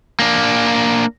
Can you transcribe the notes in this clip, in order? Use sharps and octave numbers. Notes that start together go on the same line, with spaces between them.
A#3 D4